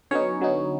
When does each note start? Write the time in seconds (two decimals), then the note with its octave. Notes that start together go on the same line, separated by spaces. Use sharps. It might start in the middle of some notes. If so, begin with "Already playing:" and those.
0.11 D3 F#3 B3 C#4 D#4 C#5
0.41 D3 F#3 B3 D#4